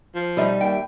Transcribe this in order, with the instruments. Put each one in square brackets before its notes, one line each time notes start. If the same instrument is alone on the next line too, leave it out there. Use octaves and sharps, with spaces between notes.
[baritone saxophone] F3
[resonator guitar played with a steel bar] B2 D#4 [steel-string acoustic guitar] G3 E5
[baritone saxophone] D#2 [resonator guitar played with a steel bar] G5